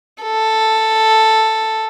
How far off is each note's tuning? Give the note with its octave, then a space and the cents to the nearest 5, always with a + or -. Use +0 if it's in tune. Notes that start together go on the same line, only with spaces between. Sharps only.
A4 +5